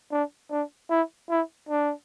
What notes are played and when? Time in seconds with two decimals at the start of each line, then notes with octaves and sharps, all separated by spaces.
0.11 D4
0.51 D4
0.90 E4
1.29 E4
1.69 D4